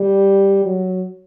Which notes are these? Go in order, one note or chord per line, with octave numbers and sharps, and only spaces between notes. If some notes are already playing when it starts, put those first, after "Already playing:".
Already playing: G3
F#3